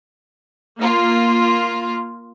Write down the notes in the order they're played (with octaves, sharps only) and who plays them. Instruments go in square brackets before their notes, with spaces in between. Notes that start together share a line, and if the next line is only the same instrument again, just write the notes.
[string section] A#3 F4